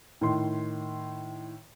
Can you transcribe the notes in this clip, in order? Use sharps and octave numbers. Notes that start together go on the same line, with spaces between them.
A2 D#3 C6